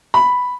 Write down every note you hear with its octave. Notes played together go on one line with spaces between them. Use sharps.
B5